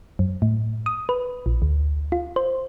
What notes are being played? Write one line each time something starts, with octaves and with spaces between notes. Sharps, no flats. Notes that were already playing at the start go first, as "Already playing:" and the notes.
F#2
A2
D#6
B4
A#1
D2
F4
C5